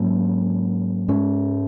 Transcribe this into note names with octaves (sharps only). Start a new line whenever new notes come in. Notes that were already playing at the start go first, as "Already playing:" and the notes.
Already playing: G#2 F#3 A#3 C#4
G#2 G#3 C#4